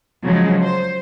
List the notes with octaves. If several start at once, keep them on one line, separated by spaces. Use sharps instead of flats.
C#3 F3 F#3 G#3
C5